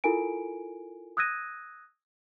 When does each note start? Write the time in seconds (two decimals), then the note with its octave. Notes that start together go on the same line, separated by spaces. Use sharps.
0.04 E4 F4 A4 A#4 G#5 D7
1.17 D#6 E6 F#6 G#6 A#6 D#7